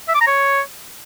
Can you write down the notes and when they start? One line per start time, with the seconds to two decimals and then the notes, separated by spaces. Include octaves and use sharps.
0.08 E5
0.14 D6
0.21 A#5
0.27 C#5